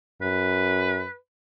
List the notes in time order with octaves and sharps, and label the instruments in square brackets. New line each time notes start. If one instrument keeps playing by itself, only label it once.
[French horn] F#2 [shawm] B4